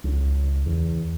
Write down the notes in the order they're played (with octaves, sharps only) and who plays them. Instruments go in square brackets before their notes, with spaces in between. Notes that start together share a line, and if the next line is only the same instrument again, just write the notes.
[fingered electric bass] C#2
E2